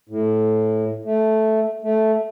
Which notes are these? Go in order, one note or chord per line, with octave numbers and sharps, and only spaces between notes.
A2
A3
A3